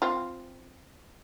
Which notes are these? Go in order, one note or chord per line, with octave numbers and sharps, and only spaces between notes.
C4 F4